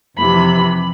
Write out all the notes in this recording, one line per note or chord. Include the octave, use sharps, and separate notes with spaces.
F2 C3 E3 B5